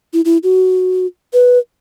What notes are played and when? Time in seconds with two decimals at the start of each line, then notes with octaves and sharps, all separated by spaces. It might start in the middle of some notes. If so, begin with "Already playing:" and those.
0.13 E4
0.25 E4
0.43 F#4
1.33 B4